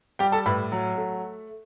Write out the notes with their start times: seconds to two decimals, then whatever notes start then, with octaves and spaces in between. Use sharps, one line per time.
0.19 G3 G4 G5
0.32 A4 A5
0.46 A2 B4 B5
0.72 F#3
0.97 A3